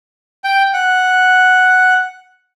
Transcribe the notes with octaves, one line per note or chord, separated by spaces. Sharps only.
G5
F#5